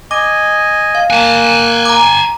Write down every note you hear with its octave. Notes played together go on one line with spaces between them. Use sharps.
D#5 G#5 D6
F5
A#3 G#5 A5 F#6
A#5 D6